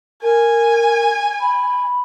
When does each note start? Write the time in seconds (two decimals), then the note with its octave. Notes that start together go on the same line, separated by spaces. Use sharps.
0.22 A#4 G#5
1.40 B5